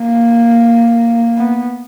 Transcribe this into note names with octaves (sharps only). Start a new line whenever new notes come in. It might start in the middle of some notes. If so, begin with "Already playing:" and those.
Already playing: A#3
B3